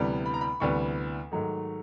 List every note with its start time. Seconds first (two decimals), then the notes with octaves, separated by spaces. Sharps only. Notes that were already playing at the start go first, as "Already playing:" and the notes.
Already playing: D2 C3 E3 G3 B3
0.26 B5
0.34 A#5
0.41 B5
0.60 D2 C3 E3 G3 B3 C#6
1.32 G#2 D#3 F#3 A3